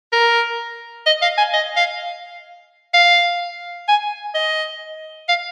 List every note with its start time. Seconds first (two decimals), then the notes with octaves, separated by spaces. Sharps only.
0.12 A#4
1.06 D#5
1.22 F5
1.38 G#5
1.53 D#5
1.76 F5
2.94 F5
3.88 G#5
4.34 D#5
5.29 F5